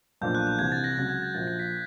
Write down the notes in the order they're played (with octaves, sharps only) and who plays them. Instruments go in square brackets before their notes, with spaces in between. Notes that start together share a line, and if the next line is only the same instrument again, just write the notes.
[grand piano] B1 A#2 F3 A#3 D4 [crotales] G6
[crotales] F#6
G6
[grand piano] C2 C3 E3 [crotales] G#6
[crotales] A6
A#6
[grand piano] C#2 C#3 F#3 [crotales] A6
[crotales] G#6
A6
[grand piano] A#1 A#2 F3 [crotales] A6
[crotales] A#6
B6